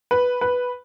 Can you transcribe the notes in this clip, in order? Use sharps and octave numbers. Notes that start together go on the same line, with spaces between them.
B4
B4